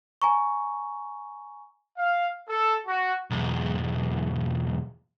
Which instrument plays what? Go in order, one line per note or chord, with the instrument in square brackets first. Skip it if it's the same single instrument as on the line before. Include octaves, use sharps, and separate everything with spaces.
[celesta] G#5 A#5 C#6
[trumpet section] F5
A4
F#4
[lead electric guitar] B1 E2